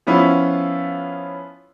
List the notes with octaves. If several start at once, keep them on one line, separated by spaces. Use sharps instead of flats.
F3 B3 C#4 E4 F4